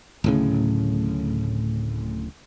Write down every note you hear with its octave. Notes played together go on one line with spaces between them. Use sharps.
D1 A2 C#3